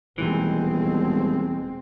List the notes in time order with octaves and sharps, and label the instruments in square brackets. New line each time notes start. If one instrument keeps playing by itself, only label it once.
[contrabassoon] D#1 [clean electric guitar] E2 E3 [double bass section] B2 G#3 C4